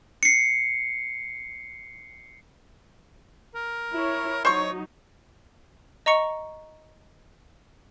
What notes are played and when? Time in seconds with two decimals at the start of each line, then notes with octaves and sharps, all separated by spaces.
0.23 C7 C#7
3.55 A#4
3.94 E4 C#5
4.45 F#3 D#4 C5 C#5 C#6
6.06 D#5 A#5 C#6 C#7